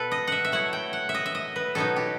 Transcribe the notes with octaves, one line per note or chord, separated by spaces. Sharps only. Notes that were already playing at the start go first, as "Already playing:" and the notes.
Already playing: B2 B3 A4 B4
D#5
E5 F#5
E5
F#3 A3 E4 F#5
G5
F#5
E5
D#5
E5
D#5
B4
B2 F#3 B3 D#4 A4
G4